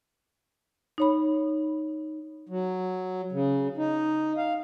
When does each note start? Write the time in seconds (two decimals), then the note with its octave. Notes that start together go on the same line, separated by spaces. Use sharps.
0.98 D#4 C#5 B5
2.49 F#3
3.32 C#3
3.77 D#4
4.37 F5